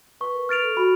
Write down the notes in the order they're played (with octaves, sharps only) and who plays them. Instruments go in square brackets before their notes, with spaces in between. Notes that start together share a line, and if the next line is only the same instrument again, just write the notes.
[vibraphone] B4 [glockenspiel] C#6
[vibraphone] B4
A#4
[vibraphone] B4 [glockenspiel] F6 A6 D7 F7
[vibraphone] A4
[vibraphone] F#4 [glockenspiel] B5